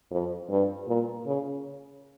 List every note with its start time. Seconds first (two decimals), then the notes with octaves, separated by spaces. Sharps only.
0.11 F2
0.50 G2
0.87 A#2
1.27 C#3